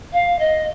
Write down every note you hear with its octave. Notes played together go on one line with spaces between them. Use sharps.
F5
D#5